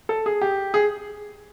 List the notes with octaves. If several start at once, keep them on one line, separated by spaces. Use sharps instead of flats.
A4
G#4
G4
G#4